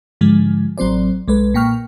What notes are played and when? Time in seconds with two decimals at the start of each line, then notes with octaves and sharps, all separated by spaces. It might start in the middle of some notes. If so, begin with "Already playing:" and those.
0.21 G#2 D3 F3 G#3
0.78 A1 F#3 C4 C5 D5
1.28 B1 G#3 A4 B4
1.54 A#2 A#3 G5 C#6 F6